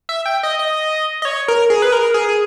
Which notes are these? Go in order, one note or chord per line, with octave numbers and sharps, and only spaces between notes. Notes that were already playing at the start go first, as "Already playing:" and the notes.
E5
G5
D#5
D#5
D#5
C#5
A#4
G#4
B4
A#4
G#4
G#4